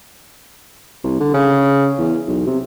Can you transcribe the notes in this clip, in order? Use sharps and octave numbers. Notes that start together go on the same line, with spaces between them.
C2
D3
C#3
E2
B1
C3